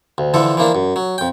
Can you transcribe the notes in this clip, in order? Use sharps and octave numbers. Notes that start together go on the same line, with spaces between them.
D2
D3 E3 F3 A4
E3 F3 A#3 D4
F#2
F#3
F2 G5